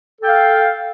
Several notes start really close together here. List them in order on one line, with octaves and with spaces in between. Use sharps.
A4 G5 F5